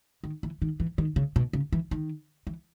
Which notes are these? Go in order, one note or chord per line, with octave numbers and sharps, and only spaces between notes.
D#3
E3
D#3
E3
D#3
C#3
B2
C#3
E3
D#3
E3